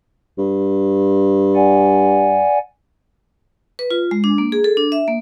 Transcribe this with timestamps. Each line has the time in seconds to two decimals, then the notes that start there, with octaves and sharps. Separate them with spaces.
0.38 G2
1.55 D5 F#5 G#5
3.79 B4
3.91 F4
4.11 G#3
4.24 D4
4.38 A#3
4.52 G#4
4.64 A4
4.77 D4
4.92 E5
5.08 A#3